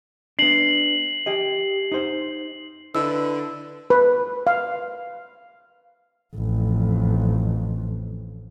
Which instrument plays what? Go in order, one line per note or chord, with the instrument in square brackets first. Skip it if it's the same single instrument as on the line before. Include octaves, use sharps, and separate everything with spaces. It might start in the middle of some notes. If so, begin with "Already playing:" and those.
[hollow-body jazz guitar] B3 D4 [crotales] C7 F#7
[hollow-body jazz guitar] G4 D#5
D#4 C5
[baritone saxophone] D3 [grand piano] E4 D#5 [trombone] B4 [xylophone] E6
[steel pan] B4
F5
[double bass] A1 F2